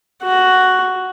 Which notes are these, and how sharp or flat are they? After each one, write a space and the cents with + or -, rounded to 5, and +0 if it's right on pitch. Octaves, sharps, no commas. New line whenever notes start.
F#4 +5